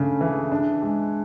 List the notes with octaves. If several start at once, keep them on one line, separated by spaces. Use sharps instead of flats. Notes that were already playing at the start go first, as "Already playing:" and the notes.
Already playing: C#3 A3 D4
E3
D4
G#3